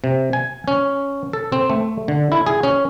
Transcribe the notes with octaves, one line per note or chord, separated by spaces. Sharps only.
C3
G#5
C#4
A4
C4
A3
D3
E4
G#4
C#4